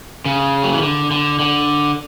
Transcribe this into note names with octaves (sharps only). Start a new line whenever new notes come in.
C#3
F#3
E3
D3
D3
D3